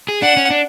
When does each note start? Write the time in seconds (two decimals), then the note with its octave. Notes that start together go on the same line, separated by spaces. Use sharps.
0.09 G#4
0.22 D4 F#5
0.37 C#4
0.51 D4